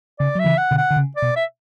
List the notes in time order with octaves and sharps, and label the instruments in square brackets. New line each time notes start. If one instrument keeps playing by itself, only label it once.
[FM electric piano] C#3 [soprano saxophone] D5
[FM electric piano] F#3 [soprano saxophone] E5
[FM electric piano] C#3 E3
[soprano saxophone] F#5
[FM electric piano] B2 D3
[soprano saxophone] F#5
[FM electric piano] D3
C#3
[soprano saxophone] D5
[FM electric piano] B2
[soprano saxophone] E5